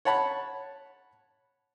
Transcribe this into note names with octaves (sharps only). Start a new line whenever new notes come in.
C#5 F#5 A5 B5